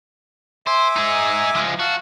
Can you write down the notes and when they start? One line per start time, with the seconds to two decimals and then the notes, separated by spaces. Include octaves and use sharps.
0.67 C5 E5 G#5 D6
0.96 D#4 G#4
1.55 F3 G#3
1.79 F#4 F5 A5